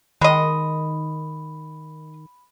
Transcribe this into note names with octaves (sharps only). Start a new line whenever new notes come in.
D#3 G#3 D#5 B5